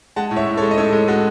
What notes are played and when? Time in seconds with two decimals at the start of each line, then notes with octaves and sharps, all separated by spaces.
0.16 G#3 F#5 A5
0.31 A2
0.37 C#5 E5
0.47 A2
0.57 A4 C#5
0.62 G#3
0.71 D#5
0.78 A2 A4 C#5
0.93 G#3
1.08 G#3 F#4 A4